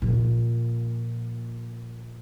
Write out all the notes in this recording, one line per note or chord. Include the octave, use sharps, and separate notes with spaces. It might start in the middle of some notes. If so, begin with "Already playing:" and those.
A#2 F3